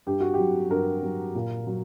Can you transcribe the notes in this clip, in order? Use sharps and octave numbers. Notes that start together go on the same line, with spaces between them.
G2 G4
F#4
F#3 G4
G2 A#4
F#3
A#2
F#3